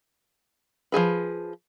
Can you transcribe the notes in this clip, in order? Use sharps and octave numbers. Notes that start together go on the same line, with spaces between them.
F3 F#3 G#4 B4